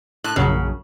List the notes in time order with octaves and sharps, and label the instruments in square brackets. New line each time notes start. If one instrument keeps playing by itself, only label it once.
[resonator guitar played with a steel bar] A2 [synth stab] F#6
[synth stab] A#1 F#2 F#3 [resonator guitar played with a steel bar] C#3